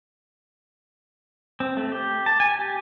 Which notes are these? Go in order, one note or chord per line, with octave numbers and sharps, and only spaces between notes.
C4
A3
G4
A5
G#5
G4